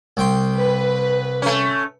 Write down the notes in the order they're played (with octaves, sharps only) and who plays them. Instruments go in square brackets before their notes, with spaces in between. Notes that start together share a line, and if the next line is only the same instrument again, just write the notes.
[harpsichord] C2 G5 C6
[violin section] B4
[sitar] A3 C#4